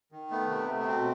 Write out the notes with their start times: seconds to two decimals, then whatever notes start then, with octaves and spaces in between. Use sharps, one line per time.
0.12 D#3
0.30 A3 B3
0.49 C3
0.69 A3
0.80 B3
0.87 B2 C4